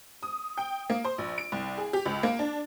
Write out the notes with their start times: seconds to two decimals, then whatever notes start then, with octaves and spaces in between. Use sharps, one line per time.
0.23 D#6
0.57 G5
0.90 A#3
1.05 C5
1.18 A#1
1.38 D7
1.52 C2
1.77 G#4
1.93 G4
2.05 C#2
2.23 A#3
2.39 D4